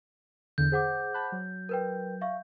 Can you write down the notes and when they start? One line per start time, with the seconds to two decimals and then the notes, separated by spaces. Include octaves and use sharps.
0.58 E2 D3 G6
0.72 G#4 C5 F#5 D6
1.14 A5 B5 F#6
1.32 F#3
1.69 A#4 B4 G5
2.21 E5 F5 C#6